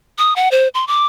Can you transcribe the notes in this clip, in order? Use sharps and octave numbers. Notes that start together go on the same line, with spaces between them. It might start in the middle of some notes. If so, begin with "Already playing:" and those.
D#6
F#5
C5
C6
D6